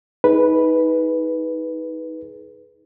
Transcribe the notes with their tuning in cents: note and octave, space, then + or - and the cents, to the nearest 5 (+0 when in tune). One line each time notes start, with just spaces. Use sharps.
D#4 +30 G#4 +20 B4 -5